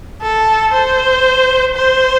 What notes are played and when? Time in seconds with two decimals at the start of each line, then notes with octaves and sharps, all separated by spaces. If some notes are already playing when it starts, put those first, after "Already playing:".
0.22 A4
0.73 C5
1.76 C5